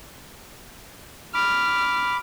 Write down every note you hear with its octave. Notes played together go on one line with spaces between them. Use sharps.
B5 D6 F6